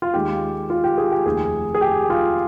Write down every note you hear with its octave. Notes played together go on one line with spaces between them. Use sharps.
F4
D#2 D#3 G#3 G4
F4
G4
G#4
G4
F1 D#2 D#3 G#4
G#4
G4
F4